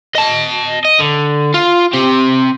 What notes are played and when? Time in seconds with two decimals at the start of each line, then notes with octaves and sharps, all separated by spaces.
0.15 D#5 A5
0.85 D#5
0.99 D3
1.54 F4
1.94 C4 G4